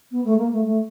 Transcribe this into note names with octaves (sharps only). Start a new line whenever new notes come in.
B3
A3
A#3
A3
A3